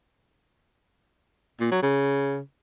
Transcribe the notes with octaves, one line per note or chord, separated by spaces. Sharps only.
A#2
F#3
C#3